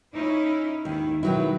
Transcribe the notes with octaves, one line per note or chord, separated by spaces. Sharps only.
C#4 D#4 E4
D#2 G#2 D#3 E4
B2 D#3 F#3 G#3 E4 B4